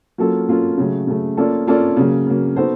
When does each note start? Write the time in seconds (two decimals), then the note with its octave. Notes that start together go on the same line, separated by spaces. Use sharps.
0.18 F#3 A#3 C#4 F4 A4
0.48 F#3 A#3 C#4 F4 A4
0.78 C#3 F#3 A3
1.07 C#3 F#3 A3
1.37 A#3 C#4 F4 A4 D5
1.67 A#3 C#4 F4 A4 D5
1.97 C#3 F#3 A#3
2.26 C#3 F#3 A#3
2.56 B3 D#4 F#4 A4 C5